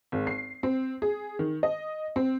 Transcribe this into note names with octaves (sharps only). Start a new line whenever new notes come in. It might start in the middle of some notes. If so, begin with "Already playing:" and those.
G#1
C7
C4
G#4
D#3
D#5
C4